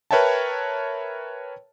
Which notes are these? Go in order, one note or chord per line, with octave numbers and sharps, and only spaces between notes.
A#4 B4 C#5 E5 G5 A5